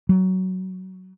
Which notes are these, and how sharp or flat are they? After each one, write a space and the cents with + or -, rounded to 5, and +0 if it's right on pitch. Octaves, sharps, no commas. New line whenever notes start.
F#3 +15